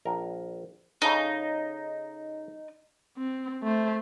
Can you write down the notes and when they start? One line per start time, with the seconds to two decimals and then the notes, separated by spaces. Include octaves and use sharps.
0.05 A#1 A#4
1.02 C#3 D#4 A4
3.18 C4
3.63 A3 C5